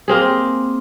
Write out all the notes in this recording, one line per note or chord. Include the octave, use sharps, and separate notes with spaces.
A#3 C4 G#4